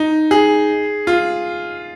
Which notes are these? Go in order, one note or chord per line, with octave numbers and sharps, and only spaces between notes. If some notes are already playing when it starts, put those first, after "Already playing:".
Already playing: D#4
G#4
F4